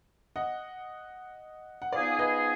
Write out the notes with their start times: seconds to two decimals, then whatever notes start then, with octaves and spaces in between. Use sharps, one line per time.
0.36 D#5 F#5
1.82 F#5
1.92 F3 B3 D#4 G#4 D5 F5
2.19 B4 D#5